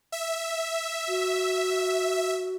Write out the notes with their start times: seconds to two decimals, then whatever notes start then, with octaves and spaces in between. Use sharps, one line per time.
0.12 E5
1.08 F#4